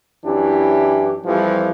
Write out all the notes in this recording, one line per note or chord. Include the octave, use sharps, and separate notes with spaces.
F#2 E3 C#4 D4 E4 G4
F2 E3 F3 G3